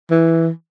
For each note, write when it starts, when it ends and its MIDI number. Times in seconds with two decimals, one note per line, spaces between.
0.10 0.49 52